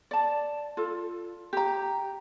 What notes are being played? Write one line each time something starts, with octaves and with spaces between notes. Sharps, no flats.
D5 A5
F4 A4
G4 A#5